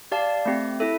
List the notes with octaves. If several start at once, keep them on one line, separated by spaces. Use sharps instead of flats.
G4 D5 F5 A5
A3 C4 G4
E4 A4 E5